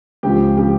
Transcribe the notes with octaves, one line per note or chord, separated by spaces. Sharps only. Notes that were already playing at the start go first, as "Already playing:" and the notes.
C#2 C#3 F3 G4
C#3 F3 G4